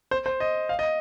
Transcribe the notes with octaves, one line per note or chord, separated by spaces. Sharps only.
C5
C5
D#5
F5
D#5